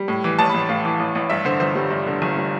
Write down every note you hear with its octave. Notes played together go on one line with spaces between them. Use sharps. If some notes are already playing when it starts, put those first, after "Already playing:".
Already playing: G3
A2
E3
A1 A5
A1 B5
A2 F5
E3
A1
A1
G2 E5
D3 C5
G1 C5
G3
G2
D3
G1
G3